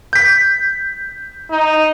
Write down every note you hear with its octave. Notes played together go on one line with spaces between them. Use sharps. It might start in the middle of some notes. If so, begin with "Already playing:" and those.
G6 B6
D#4